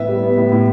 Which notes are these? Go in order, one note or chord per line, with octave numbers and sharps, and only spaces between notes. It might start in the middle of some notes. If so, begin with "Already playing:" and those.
Already playing: A2 B3 E5
G3
B3
A2
A2